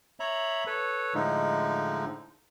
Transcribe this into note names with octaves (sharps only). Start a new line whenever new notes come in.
C#5 E5 A#5 B5
A4 B4 C#5
A2 D3 F3 G#3 D#4